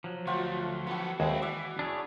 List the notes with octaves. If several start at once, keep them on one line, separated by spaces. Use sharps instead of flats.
F3 F#3
D2 A3 F4 F#4 G5
B3 F#4 A4 B5
D#2 G#3 C4 E4 B4
E3 D5 E5
D4 G#4 C#5